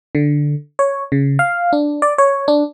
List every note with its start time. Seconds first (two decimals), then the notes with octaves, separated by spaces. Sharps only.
0.15 D3
0.79 C#5
1.12 C#3
1.39 F5
1.73 D4
2.02 D5
2.18 C#5
2.48 D4